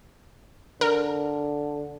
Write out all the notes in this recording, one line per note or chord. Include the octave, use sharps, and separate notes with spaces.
D3 A#4